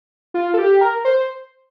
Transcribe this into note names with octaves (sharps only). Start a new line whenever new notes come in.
F4
A4
G4
A#4
C5